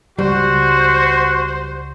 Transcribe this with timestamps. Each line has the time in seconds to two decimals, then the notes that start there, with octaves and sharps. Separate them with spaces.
0.19 C#2 G3 F#4 C5